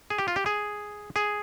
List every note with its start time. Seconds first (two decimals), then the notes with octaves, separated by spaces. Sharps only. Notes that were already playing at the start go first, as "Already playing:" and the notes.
0.10 G#4
0.18 G4
0.28 F4
0.36 G4
0.46 G#4
1.16 G#4